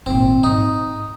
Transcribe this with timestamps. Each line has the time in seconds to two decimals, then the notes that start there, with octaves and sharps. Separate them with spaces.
0.06 G#1 A#2 C4
0.43 G#2 C4 D#4